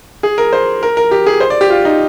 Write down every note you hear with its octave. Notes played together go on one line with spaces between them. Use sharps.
G#4
A#4
C5
A#4
A#4
G4
G#4
C5
D5
G4
F4
D#4